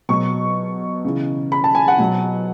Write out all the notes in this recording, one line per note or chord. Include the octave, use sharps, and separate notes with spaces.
B2 F#3 C#6
C#3 E3
B5
A5
G#5
F#5
B2 F#3